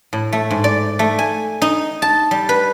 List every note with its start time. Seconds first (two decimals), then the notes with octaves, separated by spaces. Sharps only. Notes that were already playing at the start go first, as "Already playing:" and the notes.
0.13 A2
0.33 A3
0.50 G#2
0.64 D5
0.99 A3
1.19 G#5
1.62 D#4
2.02 A5
2.31 G3
2.49 B4